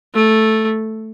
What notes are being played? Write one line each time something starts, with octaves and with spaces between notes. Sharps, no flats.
A3